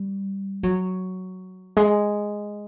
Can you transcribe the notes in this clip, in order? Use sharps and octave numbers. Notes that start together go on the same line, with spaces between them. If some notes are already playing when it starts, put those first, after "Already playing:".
Already playing: G3
F#3
G#3